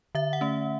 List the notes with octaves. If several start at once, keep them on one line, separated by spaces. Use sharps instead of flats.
D3 E5
F#5
A3 C#4